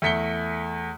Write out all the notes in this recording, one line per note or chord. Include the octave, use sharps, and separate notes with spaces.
E2 A3 B6 C#7 G7